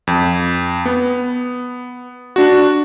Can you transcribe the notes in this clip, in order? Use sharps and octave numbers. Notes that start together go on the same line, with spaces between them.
F2
B3
D4 F#4